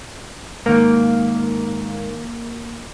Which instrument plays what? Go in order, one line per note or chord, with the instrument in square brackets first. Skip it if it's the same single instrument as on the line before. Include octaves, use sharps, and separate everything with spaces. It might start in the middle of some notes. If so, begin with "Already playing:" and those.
[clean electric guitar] G#2 D#3 [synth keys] A#3